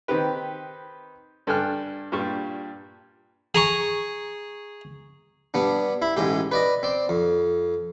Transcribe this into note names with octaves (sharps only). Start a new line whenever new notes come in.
D#3 C4 G4 B4
G2 A4 G5 G#5 F6 F#6
G2 A#2 G3 G4 C#6
G#4 A#5 C#6
G2 B3 D4
E4 B5
A1 G#2 G#3 G4
B4 D5 D#5
C4 D5
F2